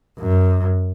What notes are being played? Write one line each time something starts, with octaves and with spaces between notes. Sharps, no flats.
F#2